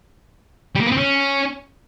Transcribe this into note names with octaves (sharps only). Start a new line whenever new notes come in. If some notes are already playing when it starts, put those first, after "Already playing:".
G3
A#3
B3
C4
C#4